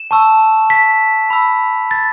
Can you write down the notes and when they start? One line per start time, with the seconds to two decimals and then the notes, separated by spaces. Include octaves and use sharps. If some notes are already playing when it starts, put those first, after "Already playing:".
Already playing: E7
0.11 A5 C#6 E6
0.70 B6
1.30 B5 E6
1.91 A6